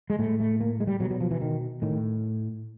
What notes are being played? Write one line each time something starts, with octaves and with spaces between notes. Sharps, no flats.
G#3
A2 A3
A3
A#3
G#3
G3
B2 F#3
F#3
F3
E3
D#3
A2 D#3